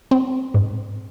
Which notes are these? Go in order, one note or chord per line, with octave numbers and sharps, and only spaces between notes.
C4
G#2